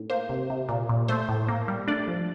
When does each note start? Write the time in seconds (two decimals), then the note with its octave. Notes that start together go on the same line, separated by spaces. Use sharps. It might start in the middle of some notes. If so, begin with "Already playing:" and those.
Already playing: A2
0.10 A#3 C5
0.29 C3
0.50 C3
0.69 A#2
0.89 A#2
1.08 A3 C5
1.29 A2
1.49 A#3
1.68 G3
1.88 A3 D4 D5
2.08 F3